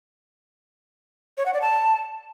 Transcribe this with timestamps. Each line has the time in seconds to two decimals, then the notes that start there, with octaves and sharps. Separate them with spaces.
1.38 C#5
1.46 F#5
1.54 D5
1.62 A5